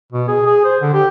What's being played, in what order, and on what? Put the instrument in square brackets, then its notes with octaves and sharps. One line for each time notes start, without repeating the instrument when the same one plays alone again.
[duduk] B2
G#4
G#4
C5
D3
G4